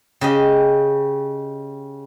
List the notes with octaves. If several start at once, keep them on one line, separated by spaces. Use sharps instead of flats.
C#3 G4 D#5